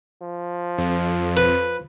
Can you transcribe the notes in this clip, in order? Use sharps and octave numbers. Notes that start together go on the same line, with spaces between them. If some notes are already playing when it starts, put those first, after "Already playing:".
F3
F2
B4